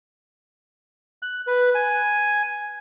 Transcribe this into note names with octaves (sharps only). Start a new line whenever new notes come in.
F#6
B4
G#5